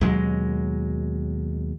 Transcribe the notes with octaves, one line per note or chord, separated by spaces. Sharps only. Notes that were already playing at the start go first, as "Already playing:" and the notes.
D#2 B2 F#3 G#3